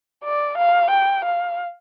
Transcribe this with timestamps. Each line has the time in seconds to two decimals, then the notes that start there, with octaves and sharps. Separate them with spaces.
0.24 D5
0.58 F5
0.91 G5
1.25 F5